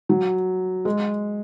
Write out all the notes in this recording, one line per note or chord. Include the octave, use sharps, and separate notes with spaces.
F#3
G#3